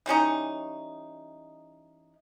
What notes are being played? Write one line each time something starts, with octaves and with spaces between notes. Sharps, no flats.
E3 G3 C#4 D#4